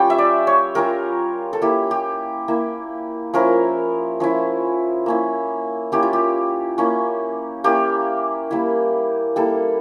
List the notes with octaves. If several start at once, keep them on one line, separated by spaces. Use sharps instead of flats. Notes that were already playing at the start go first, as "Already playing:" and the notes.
Already playing: G3 C#4 F4 G5
E5
D5
C#5
G3 C#4 F4 A#4
A4
A#3 E4 G4
G4
A#3 E4
F3 C#4 E4 A#4
F3 C#4 E4
A#3 C#4 E4
A#3 C#4 E4 G4
F4
G4
A#3 C#4 E4
A#3 C#4 E4 G4
G3 A#3 E4
G3 A#3 E4 A4